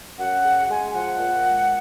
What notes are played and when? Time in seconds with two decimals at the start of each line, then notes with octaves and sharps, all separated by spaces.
0.18 F#2 F#5
0.43 C#3
0.69 G#3 G#5
0.93 F3 F#5
1.18 A#2
1.43 G#3